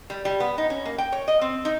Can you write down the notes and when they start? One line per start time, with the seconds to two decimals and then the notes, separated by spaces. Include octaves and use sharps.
0.10 G3
0.25 G3
0.40 B3
0.58 D#4
0.70 C#4
0.85 A#3
0.98 G5
1.12 C#5
1.28 D#5
1.41 C4
1.65 D#4